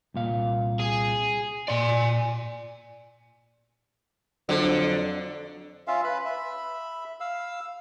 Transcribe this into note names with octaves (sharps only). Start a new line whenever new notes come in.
C2 A#2 F5
G#4
A#2 D5 G#5 C6
F2 D3 F#3
C#4 F4 E5 F5
B4 B5
E5 B5
F5 E6